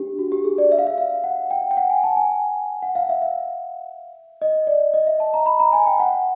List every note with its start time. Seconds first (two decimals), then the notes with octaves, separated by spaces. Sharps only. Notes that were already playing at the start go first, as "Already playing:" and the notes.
Already playing: D4 G4
0.19 F#4
0.32 G4
0.44 G#4
0.58 D5
0.72 E5
0.79 F5
0.87 E5
0.98 F5
1.24 F#5
1.51 G5
1.71 G5
1.77 F#5
1.90 G#5
2.04 A5
2.16 G#5
2.82 F#5
2.95 F5
3.09 E5
3.22 E5
4.42 D#5
4.67 D5
4.94 D#5
5.07 E5
5.20 A5
5.34 A#5
5.46 B5
5.60 A#5
5.73 G#5
5.86 G5
6.00 F#5